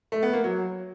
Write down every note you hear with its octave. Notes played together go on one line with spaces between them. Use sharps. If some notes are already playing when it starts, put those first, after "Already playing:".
A3
B3
A#3
F#3